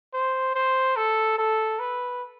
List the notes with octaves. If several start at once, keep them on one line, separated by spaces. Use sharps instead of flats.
C5
C5
A4
A4
B4